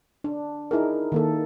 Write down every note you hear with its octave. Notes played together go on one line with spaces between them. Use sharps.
D4
D#4 E4 G#4 A#4
D#3 A#3 A4